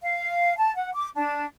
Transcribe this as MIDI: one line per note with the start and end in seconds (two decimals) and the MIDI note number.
0.01 0.56 77
0.58 0.74 81
0.76 0.91 78
0.94 1.08 86
1.15 1.46 62